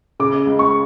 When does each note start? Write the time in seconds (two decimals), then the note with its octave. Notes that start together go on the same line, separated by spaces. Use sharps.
0.20 C#3 D6
0.47 C#2
0.59 C#6